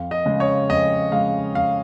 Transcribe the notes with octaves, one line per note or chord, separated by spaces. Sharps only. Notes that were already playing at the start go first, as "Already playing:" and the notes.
Already playing: F2 F5
D#5
C#3 G#3
C#5
F2 D#5
C#3 G#3 F5
F2 F5